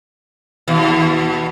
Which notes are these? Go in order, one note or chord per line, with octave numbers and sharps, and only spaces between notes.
D#2 B2